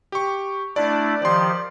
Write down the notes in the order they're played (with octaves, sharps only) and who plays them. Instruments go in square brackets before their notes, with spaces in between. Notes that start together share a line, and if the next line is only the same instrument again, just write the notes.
[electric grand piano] G4 C#6
[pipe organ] A3 D4 E4 [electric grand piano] D5
[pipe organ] D#3 F3 G4 [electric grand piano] D5 C6